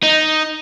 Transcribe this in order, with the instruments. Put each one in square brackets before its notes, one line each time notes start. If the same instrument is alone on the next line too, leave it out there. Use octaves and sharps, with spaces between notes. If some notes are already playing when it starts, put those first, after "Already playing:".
[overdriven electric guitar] D#4